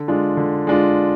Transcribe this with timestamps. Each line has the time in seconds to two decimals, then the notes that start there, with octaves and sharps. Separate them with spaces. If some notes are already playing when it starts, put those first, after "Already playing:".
Already playing: D3
0.08 G#3 D4 F4
0.37 D3
0.67 G#3 D4 F4